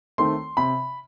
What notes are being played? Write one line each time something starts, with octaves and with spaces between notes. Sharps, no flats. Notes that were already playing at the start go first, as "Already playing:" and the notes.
D#3 A3 C4 C6
C3 B5